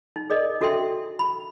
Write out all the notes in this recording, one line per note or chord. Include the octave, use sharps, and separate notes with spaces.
D#4
G#4 A#4 D5 D#5
D4 F#4 A4 E5 G5 C6
B5